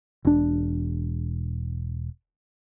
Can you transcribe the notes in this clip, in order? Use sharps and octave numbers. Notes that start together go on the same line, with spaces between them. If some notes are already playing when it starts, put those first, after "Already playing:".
E1 D4